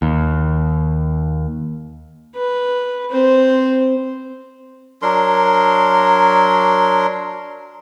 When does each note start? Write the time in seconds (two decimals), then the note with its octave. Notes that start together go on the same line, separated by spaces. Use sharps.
0.02 D#2
2.35 B4
3.10 C4 C5
5.02 F#3 D4 A#4 C6